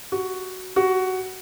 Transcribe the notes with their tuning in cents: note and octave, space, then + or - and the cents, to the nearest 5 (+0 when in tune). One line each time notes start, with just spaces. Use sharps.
F#4 +5
F#4 +10